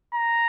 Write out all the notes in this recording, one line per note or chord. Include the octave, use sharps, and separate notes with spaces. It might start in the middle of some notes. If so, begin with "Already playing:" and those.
A#5